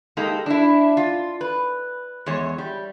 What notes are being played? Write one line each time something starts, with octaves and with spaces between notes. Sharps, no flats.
G#3 A#3 D#4 G4 A4
D4 E4
F4
B4
E2 G#3 C#5
G3